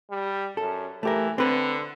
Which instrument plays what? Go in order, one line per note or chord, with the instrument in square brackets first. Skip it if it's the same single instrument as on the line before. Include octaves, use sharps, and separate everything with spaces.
[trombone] G3
[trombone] F#2 [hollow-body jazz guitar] A4
[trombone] E3 [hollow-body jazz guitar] A3 G4 A#4
[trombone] D3 [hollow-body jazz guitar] C4 B4